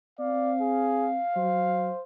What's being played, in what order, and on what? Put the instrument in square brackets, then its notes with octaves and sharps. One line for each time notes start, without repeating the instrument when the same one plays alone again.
[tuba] C4 [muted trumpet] D5 [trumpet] F5
[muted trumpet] G#4
[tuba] F#3 [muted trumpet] C5